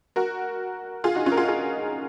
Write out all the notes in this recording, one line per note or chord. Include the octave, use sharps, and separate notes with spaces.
F#4 A#4
F4 G#4
D#4 F#4
C#4 F4
A#4
F4 G#4
F4 G#4